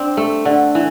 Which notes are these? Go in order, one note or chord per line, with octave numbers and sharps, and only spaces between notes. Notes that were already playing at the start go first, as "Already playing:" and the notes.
Already playing: C4 D4
A3
D3
E3